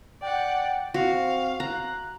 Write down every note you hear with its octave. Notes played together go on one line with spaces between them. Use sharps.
D5 F#5 G5
C4 F#4 F5
A#5 F#6